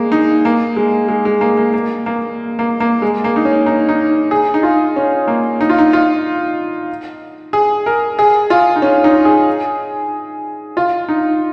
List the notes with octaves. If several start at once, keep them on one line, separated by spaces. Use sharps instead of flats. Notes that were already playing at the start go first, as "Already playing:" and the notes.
Already playing: G#3 A#3
D#4
A#3
G#3
G#3
G#3
A#3
A#3
A#3
A#3
A#3
A#3
G#3
A#3
D#4
C#4
D#4
D#4
G#4
D#4
F4
C#4
A#3
D#4
F4
D#4
F4
G#4
A#4
G#4
F4
D#4
C#4
D#4
G#4
F4
D#4